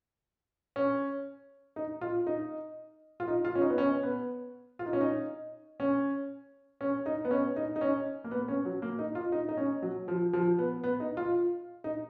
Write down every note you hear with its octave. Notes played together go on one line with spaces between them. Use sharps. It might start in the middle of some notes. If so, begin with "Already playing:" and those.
C#4
D#4
F4
D#4
F4
D#4
F4
C#4
D#4
B3
C#4
B3
F4
D#4
C#4
D#4
C#4
C#4
D#4
B3
C#4
D#4
D#4
C#4
A#3
B3
C#4
F#3
A#3
D#4
F4
D#4
D#4
C#4
F#3
F3
F3
B3
B3
D#4
F4
D#4